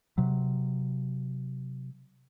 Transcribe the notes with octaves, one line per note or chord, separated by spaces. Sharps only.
C3 F#3